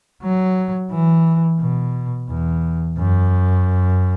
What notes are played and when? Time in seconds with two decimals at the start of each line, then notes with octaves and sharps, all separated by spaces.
0.23 F#3
0.91 E3
1.60 B2
2.29 E2
2.98 F#2